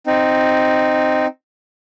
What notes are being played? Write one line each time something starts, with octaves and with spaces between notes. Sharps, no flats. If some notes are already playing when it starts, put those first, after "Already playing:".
C4 D#4